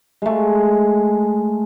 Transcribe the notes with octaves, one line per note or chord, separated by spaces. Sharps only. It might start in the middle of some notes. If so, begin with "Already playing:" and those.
G#3 A3